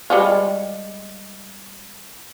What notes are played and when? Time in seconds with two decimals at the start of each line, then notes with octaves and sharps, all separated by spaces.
0.10 G3 G#3 F4